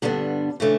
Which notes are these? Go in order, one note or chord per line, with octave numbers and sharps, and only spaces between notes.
G2 D3 G3 B3 D4
C#3 E3 A3 D4